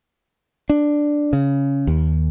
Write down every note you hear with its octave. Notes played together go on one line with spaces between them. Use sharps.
D4
C#3
D#2